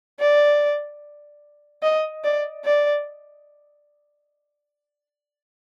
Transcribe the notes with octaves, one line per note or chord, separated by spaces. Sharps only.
D5
D#5
D5
D5